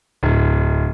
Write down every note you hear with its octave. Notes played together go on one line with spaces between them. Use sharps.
D1